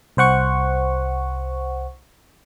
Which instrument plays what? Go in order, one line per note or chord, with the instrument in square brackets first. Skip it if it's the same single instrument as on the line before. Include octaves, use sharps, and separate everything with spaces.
[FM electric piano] C2 C5 F#5 C#6